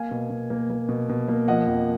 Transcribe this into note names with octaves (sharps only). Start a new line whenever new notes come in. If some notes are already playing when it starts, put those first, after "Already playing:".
Already playing: A#3 F5 G#5
B2
B2
A#3
A#3
B2
B2
A#3
F3 D#5 F#5
F2